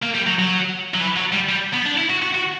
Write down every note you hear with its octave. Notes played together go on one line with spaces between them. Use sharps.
A#3
G3
F#3
F#3
F#3
E3
F#3
G3
G3
B3
D4
E4
F#4
F#4
F#4